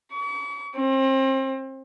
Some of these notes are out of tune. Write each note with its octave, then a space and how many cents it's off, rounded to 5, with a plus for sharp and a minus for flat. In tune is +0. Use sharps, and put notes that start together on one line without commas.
C#6 +45
C4 +35